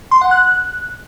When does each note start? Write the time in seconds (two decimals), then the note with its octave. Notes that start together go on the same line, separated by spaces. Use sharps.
0.11 C6
0.21 F#5
0.31 F#6